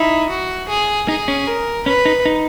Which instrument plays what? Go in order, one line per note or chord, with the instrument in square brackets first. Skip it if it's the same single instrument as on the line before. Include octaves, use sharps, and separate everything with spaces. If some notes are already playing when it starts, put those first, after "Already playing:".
Already playing: [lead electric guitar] D#4 [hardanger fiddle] E4
[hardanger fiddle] F#4
G#4
[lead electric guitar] D#4 [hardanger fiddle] G#4
[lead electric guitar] C#4
[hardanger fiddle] A#4
[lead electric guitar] C#4 [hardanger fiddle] B4
[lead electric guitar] D#4
D#4